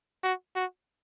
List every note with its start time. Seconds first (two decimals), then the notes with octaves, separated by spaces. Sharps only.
0.23 F#4
0.55 F#4